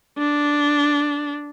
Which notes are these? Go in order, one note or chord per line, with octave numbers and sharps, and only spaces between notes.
D4